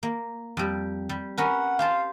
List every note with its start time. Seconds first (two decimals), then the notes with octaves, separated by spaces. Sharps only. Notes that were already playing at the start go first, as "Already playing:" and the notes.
0.03 A#3
0.57 F2 G3
1.09 G3
1.38 C#4 A#4 B4 F#5
1.79 G4 C5 F5 A5